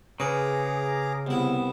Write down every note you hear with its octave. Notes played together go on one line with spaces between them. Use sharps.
C#3 G#4 B4 A#5 D6
C2 B3 E4